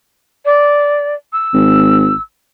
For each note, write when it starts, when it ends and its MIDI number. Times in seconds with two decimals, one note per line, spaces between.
0.45 1.14 74
1.32 2.21 88
1.54 2.13 32